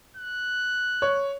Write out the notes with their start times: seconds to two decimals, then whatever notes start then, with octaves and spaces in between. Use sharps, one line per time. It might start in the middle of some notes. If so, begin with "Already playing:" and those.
0.17 F#6
1.02 C#5